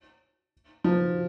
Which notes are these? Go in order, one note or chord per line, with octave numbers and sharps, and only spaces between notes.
F3